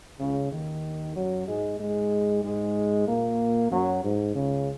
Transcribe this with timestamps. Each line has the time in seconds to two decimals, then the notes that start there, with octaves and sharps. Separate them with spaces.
0.20 C#2 C#3
0.52 D#2 D#3
1.15 F#2 F#3
1.47 G#2 G#3
1.79 G#2 G#3
2.44 G#2 G#3
3.07 A#2 A#3
3.71 F#2 F#3
4.03 G#2
4.35 C#2 C#3